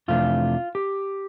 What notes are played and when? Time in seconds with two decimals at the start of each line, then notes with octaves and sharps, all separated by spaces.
0.08 F2 C3 E3 A3 D4 F4
0.75 G4